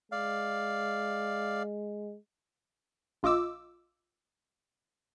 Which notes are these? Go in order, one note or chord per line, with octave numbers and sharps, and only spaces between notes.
G#3 D5 F5
A#1 F4 D#5 D6 E6